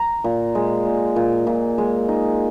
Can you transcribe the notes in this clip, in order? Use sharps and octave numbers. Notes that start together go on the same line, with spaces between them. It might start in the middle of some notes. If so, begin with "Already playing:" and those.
Already playing: A#5
A#2
G#3
A#2
A#2
A#2
G#3
D#4